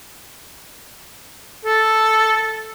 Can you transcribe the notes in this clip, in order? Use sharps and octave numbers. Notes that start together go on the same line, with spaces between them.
A4